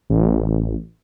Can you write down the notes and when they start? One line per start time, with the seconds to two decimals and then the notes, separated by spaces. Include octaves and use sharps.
0.10 A1